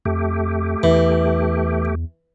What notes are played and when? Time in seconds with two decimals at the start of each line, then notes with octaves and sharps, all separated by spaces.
0.05 F2 A3 G4
0.83 E2 E3